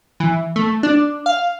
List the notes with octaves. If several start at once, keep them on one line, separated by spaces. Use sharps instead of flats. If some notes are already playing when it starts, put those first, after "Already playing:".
E3
A3
D4
F5